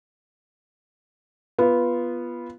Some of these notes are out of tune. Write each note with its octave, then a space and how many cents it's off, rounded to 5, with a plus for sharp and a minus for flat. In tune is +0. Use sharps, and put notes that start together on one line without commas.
B3 -10 F4 -15